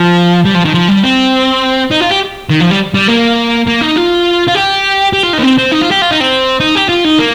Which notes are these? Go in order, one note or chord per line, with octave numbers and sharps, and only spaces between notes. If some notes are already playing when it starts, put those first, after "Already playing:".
Already playing: F3
G3
F3
D#3
F3
G3
C4
D#4
F4
G4
D#3
F3
G3
G3
A#3
A#3
D#4
F4
F4
G4
G4
F4
D#4
A#3
C4
C4
D#4
F4
G4
F4
D#4
C4
D#4
G4
F4
D#4
A#3